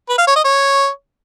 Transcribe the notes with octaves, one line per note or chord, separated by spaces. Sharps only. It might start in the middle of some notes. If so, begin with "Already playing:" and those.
B4
F5
C#5
D#5
C#5